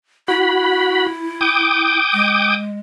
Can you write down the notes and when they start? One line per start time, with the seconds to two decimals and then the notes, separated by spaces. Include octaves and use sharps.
0.28 E4 F#4 B5
1.41 G5 D6 D#6
2.13 G#3